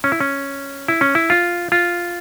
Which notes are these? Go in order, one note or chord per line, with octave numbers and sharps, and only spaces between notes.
C#4
E4
C#4
E4
C#4
E4
F4
F4